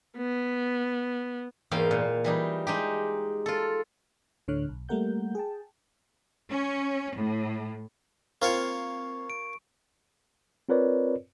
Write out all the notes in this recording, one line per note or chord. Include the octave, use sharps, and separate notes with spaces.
B3
E2 G#2 A#3 F5 G5
A#2
E3 G3 D#4
G#3 D#4 G4
F4 A4
D2 A2 D3 C#5 F6 F#6
B1
G3 A3 A#3 A#4 F#5 G6
G#4 G5 A5
C#4
A2
A#3 C4 F4 C#5 C#6
D7
C4 F4 A#4 B4 C#5 D5